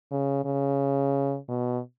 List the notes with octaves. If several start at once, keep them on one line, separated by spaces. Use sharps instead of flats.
C#3
C#3
B2